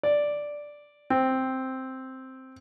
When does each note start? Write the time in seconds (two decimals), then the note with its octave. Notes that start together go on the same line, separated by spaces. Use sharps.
0.03 D5
1.10 C4